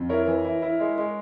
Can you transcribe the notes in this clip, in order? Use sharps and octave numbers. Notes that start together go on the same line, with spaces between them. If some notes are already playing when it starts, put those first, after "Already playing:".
Already playing: F2
E4 A#4 C#5
E3
E4
E4
G#3
G#3